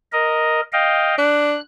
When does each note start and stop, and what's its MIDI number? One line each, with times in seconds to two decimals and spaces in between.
0.12 0.61 70
0.12 0.61 75
0.73 1.15 75
0.73 1.15 77
0.73 1.15 79
1.18 1.57 62
1.18 1.60 90